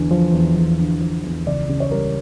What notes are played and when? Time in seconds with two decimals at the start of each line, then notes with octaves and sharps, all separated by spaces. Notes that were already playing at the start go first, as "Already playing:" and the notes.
Already playing: E2 D3
0.11 F3
0.32 E2
0.55 E2
0.79 D3
1.01 F3
1.24 E2
1.46 C#2 D5
1.69 C#3
1.80 C#5
1.91 G3 A#4